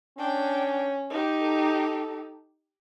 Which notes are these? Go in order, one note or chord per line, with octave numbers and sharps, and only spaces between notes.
C#4 D4 G5
D#4 G4
A4